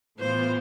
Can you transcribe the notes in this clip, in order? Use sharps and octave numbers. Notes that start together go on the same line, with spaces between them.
A2 E3 B3 F4 C5